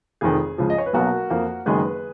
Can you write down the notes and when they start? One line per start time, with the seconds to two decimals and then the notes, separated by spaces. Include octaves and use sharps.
0.21 F1 F2 D#3 G#4
0.58 C#2 C#3 F3
0.70 D#5
0.78 C#5
0.86 B4
0.93 B1 B2 F#3 A#3 F#4 A#4
1.30 F2 F3 A#3
1.66 F#1 F#2 D#3 G#3 B3 G#4 B4